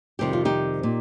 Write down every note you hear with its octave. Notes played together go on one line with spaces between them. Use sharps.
F2 C3 D#3 G3 G4
F4
D#4 G4
A#2